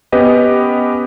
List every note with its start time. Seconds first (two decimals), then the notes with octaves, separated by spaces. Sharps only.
0.12 B3 C#4 G4 B4 D#5